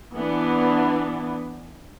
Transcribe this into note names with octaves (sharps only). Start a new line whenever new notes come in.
E3 B3 D4